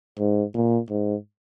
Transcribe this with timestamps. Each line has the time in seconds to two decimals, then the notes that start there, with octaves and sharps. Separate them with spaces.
0.19 G#2
0.54 A#2
0.90 G#2